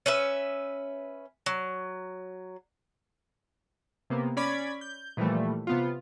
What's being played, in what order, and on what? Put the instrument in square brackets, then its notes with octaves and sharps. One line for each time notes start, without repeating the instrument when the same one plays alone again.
[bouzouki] C#4 B4 E5
F#3
[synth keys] C3 A#3 B3
C#4 D5 B5 G#6 B6
G6
A#2 E3 F3 G3 A3
C3 B3 F4